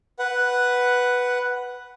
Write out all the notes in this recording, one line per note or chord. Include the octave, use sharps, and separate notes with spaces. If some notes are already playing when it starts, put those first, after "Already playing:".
B4 F#5